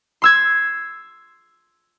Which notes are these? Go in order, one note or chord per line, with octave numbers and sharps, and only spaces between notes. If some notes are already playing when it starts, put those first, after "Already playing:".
C6 E6 G#6